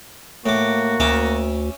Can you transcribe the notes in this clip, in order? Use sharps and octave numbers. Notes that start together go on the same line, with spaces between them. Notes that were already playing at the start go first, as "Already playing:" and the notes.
A2 A#3 F#4 D6
D2 C#4 E5 D6